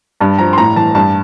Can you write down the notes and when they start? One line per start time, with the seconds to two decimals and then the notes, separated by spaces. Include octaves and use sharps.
0.20 G2 A5
0.39 F3 A#5
0.53 C6
0.57 A2 A#5
0.76 E3 A5
0.95 G2 A5